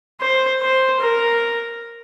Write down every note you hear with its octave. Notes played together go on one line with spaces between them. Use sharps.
C5
C5
A#4